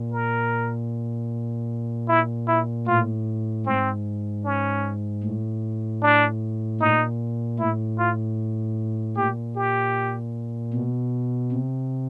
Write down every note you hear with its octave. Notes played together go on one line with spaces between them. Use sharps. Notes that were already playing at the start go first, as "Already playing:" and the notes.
Already playing: A#2
A#4
E4
E4
A2 F4
G#2 C4
C#4
A2
D4
A#2 D#4
A2 E4
F4
A#2 G4
G4
B2
C3